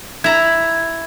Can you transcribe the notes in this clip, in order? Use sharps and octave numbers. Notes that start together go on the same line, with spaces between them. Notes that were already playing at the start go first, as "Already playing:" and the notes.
E4 A#5 G#6